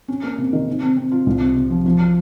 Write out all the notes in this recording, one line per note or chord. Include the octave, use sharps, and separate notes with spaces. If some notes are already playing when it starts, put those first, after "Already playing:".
C#4
A#3
C3
D#3
C3
C4
C4
F4
C2
C3
C3
F3
F3